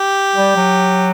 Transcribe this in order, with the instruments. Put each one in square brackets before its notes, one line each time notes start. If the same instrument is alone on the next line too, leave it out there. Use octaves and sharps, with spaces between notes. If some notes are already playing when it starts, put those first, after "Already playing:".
Already playing: [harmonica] G4
[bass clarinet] G3
F#3